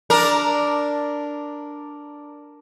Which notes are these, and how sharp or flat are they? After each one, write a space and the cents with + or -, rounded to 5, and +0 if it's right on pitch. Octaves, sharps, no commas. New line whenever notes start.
D4 +0 A#4 +0